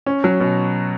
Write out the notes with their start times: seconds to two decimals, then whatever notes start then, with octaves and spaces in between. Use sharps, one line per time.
0.06 C#4
0.24 F#3
0.40 B2